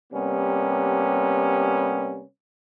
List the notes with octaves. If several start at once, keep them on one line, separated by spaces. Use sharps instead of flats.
C3 G3 A#3 B3 C#4